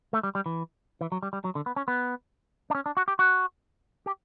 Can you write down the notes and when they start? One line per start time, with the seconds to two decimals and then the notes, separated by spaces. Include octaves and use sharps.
0.13 A3
0.23 G3
0.35 G3
0.46 E3
1.01 E3
1.12 F#3
1.23 G3
1.33 G3
1.44 F#3
1.55 D3
1.66 B3
1.76 C#4
1.88 B3
2.70 D4
2.75 C#4
2.86 D4
2.97 F#4
3.08 G4
3.19 F#4
4.06 G4